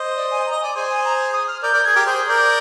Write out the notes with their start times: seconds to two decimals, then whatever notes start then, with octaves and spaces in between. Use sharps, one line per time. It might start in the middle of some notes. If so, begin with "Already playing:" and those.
Already playing: C5 D#5
0.16 D5
0.31 G#5
0.47 D#5 A#5
0.61 D5 G#5
0.75 G#4 C5 G#5
0.90 G#5
1.04 A#5
1.33 D#6
1.48 F6
1.63 A#4 D5 G6
1.74 A#4 D5
1.84 G#4 G#6
1.95 G4 A#4
2.06 G#4 C5 G6
2.28 A#4 D5 G6